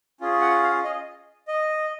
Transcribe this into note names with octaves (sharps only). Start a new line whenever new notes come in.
C#4 F4 G#4
F#5
F5
D#5
D#5